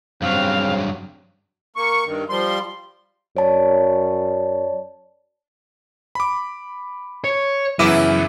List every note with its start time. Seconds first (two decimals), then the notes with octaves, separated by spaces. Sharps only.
0.22 G2 C#3 F#3 C4 F5
1.76 A#3 C#6
2.05 G2 D#3
2.30 F3 G3 C6
3.37 F#2 C#5 D5 A5
6.15 B5 D6
7.24 C#5
7.79 F#2 C#3 E3 B3 E4 D6 D#7